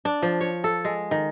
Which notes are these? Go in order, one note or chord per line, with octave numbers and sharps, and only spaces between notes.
D4
F3
C#5
A4
G#3
D#3